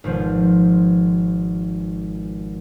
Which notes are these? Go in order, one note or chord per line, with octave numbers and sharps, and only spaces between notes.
G#1 B2 F3 C5